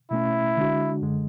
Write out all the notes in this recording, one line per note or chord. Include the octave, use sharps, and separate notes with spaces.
B2 A3 C#4 E4
D3 G#3 D4 F#4
F#2 D3 G#3